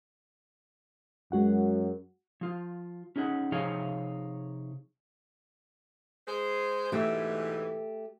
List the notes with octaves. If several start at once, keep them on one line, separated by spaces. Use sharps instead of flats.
F#2 G#3 F#4 F#5
F3 F4
C#4 D#4 G#4 D#5 F#5
C3 F3 D#4 G#4 C#5 F5
G#3 G#4 C5
G#2 B2 E3 A3 G4